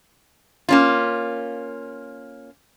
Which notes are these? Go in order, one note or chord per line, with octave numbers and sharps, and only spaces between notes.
A#3 C#4 F4